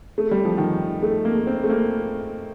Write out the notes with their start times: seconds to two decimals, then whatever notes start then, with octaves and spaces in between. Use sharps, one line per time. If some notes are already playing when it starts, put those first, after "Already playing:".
0.18 A3
0.31 G3
0.45 F3
0.58 D#3
1.02 A3
1.25 A#3
1.47 C4
1.64 A3
1.69 A#3